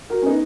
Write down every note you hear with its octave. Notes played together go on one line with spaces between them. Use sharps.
F#4 A#4
C#4
B3 D#4